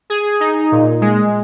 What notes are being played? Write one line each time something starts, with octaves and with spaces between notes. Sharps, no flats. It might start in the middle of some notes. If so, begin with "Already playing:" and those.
G#4
D#4
A#2
G#3